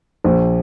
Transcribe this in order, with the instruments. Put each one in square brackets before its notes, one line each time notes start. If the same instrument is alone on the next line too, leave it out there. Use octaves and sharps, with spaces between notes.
[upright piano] A#1